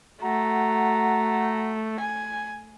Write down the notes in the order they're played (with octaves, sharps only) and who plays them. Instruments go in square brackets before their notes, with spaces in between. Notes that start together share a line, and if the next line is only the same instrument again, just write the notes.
[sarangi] A3 [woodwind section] F#4 F#5 A#5
[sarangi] G#5